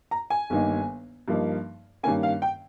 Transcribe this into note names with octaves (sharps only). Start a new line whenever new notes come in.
A#5
G#5
G1 G2 D#3 A#3 D#4
G2 F3 A#3 D#4
G2 D#3 A#3 C#4 G#5
F5
G5